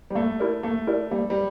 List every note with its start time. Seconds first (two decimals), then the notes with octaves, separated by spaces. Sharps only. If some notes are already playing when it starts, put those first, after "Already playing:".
0.10 G3
0.15 A3 A#3
0.40 E4 G4 A#4 D5
0.63 A3 A#3
0.87 E4 G4 A#4 D5
1.11 G3 A#3
1.30 G3